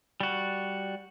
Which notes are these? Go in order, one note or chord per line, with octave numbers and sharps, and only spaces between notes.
G3 F#4